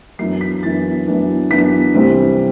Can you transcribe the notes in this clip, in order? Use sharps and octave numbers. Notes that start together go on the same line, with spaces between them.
F#2 E3 B3 D4 C7
B6
F#2 E3 B3 D4 A6
F#2 E3 B3 D4
F#2 E3 B3 D4 B6
C2 C3 E3 G3 C4